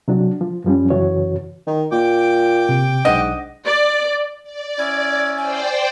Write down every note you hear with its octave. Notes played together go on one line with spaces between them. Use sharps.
C3 F#3 D4 F#4
F3
F#2 F3 G3 C#4
F#2 C#3 E3 F#4 C#5
D#3
A#2 G5 D6
C3
B1 G#2 D4 D#5 F#5
D5
D5
C#4 E4 G#6
C5 D5 G5 G#5